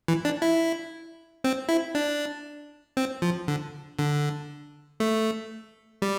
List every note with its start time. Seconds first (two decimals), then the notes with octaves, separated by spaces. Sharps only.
0.08 E3
0.25 D4
0.42 E4
1.44 C4
1.69 E4
1.95 D4
2.97 C4
3.22 F3
3.48 D3
3.99 D3
5.00 A3
6.02 G3